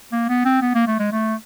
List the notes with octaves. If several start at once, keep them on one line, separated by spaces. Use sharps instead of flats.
A#3
B3
C4
B3
A#3
A3
G#3
A3